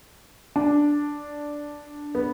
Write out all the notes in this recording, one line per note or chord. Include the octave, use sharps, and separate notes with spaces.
D4
B3